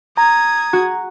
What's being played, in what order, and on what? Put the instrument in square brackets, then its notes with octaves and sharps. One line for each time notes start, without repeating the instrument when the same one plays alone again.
[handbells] A#5 [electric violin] D#6 G#6
[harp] F#4